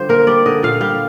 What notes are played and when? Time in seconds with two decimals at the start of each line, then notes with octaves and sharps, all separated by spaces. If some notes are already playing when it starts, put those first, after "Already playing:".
Already playing: D3 G3 F4 C5
0.09 A#3 A#4
0.27 G3 D5
0.46 D3 D#5
0.63 A#2 F5
0.81 G3 F5